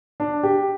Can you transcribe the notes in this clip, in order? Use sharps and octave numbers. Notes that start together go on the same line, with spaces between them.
D4
G4